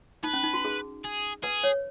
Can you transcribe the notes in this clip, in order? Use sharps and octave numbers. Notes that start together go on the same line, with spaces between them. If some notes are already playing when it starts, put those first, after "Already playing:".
D#4 B4
C#4
D#4
F#4
G#4
G#4
G#4 B4
C#5